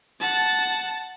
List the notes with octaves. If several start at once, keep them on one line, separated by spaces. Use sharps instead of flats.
F#5 A5